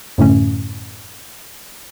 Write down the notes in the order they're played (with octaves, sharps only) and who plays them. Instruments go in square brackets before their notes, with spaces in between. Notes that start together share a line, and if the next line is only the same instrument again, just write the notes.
[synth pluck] F#2 A2 D3 A3 C#4